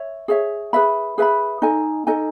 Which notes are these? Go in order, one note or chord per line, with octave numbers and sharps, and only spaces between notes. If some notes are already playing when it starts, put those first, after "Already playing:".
Already playing: C#5 E5
G#4 C#5 E5
G#4 B4 E5 B5
G#4 B4 E5 B5
D#4 A4 D#5 G#5
D#4 A4 D#5 G#5